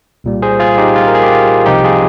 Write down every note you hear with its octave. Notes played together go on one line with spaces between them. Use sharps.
C2 A#2 G3
G#4 C5
F4 G#4
D#4 G4
F4
A#4
G#4
G4
F4
C2 C3 F3 D#4 G4
F4 G#4